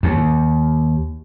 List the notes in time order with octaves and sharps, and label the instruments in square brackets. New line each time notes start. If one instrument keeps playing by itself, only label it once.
[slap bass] D#2